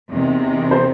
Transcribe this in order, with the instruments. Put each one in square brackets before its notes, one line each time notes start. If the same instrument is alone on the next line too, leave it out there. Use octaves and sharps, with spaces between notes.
[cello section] E2 C3 D#3
[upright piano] C5